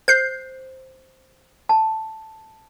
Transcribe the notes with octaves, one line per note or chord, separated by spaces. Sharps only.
C5 G6 C7
A5